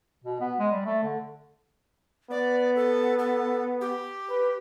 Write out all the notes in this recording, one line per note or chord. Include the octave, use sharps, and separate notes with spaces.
B2
B3
G#3
G3
A3
D3
B3 D5
A4
A4
G4
B4